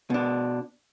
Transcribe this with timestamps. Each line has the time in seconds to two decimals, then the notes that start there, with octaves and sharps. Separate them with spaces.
0.10 B2 D4